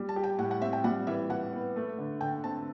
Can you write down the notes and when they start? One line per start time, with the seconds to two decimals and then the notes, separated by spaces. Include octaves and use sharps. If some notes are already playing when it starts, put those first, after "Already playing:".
Already playing: G3
0.09 A5
0.16 G4
0.24 G5
0.38 A2 F#5
0.51 F#5
0.61 C4 E5
0.73 G5
0.84 G3 F#5
1.07 E3 E5
1.29 E3 F#5
1.53 B3
1.76 A3
1.98 D3
2.21 D3 G5
2.44 C4 A5